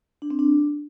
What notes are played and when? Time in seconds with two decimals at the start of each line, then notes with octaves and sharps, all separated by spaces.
0.22 D4
0.30 C4
0.39 D4